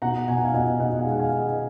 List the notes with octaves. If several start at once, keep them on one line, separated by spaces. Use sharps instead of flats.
B2 F#5 A#5
B2 G#5
F#5
F5 G#5
B2 D#5 F#5
B2 D#5 F#5
F5 G#5
G#3
F#5
F5 G#5
G#3
D#5 F#5